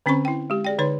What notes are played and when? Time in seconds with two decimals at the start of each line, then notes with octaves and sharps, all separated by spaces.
0.06 D3 C4 C#4 C5 B5 C#6
0.25 E4 G5
0.50 G#3 G4
0.65 G#4 D5 G5
0.79 D3 D#4 B4 C#5 C6